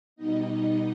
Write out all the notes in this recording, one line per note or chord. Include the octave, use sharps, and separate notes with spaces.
B2 G3 B3 D#4 D#5